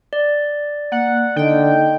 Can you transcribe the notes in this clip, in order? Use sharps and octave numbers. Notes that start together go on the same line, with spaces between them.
D5
A#3 F#5
D3 D#4 D#5 G5